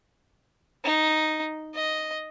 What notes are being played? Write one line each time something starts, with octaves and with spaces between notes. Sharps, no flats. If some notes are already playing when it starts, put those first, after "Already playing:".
D#4
D#5